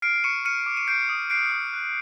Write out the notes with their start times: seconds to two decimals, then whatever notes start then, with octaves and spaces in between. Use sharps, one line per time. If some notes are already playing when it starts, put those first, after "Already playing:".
0.02 F6 C7 D7
0.24 C#6 C#7 D#7
0.45 F6 C#7 D#7
0.66 D6
0.77 D#7
0.88 G6 C7 D7
1.09 D#6
1.30 F#6 C7 D7
1.52 D#6
1.73 F#6